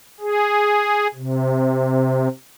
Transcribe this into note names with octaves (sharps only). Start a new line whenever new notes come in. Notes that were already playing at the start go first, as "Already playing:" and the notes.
G#4
C3